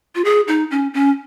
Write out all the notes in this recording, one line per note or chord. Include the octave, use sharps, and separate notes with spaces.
F4
G#4
D#4
C#4
C#4